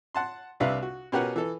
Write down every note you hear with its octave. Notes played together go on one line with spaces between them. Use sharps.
F#5 A5 C6
C2 C3 D4 B4 E5 F5
F#4
B2 C#4 G4 A#4 B4 F#5
E3 A4